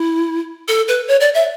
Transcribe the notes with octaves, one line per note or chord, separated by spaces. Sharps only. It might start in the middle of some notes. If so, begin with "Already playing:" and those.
Already playing: E4
A4
B4
C#5
D5
E5